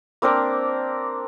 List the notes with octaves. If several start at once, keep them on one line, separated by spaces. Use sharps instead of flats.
A#3 C4 D4 A#4